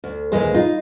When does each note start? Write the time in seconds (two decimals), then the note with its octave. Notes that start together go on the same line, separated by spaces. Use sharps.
0.04 D2
0.32 D#2 A#2 E3 G#3 G#4 C5
0.54 D#4 F4